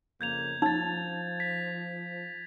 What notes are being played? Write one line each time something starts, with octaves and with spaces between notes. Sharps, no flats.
F2 C#3 A#3 G6 G#6 F7
F3 D#4 G#6 A6
B6